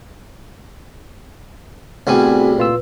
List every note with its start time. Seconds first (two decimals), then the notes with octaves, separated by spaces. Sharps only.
2.07 C2 A2 G3 B3 C4 F#4 G#4 G#5
2.58 A#2 F4 B4 E6